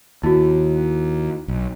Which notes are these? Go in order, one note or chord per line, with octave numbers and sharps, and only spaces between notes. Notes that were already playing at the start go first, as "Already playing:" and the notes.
D#2 E4 F#4
B1